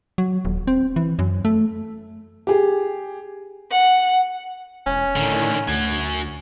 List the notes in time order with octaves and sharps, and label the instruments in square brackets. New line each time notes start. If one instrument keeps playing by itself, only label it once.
[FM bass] F#3
D#1
C4
E3
F#2
A3
[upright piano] G4 G#4
[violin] F#5
[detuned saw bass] E1 [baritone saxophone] C#4
[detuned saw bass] A2 [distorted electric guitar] D3 D#3
[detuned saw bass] D2 [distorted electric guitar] F#4 G#5